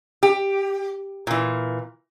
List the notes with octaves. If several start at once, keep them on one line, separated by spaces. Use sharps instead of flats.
G4
A#2 E3